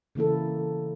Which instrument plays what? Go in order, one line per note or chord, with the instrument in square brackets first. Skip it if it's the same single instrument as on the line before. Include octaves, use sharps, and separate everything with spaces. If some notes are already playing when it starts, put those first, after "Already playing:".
[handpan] C#3 E3 A#3 E4 A4